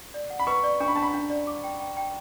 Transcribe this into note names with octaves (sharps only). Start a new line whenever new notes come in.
D5
F#5
B5
B4 C#6
D5
D4 C#6
B5
D4 A5
B5
D4
D5
D6
G5
G5
G5